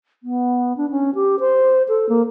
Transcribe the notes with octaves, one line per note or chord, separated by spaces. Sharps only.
B3
D4
C#4
G4
C5
A4
A#3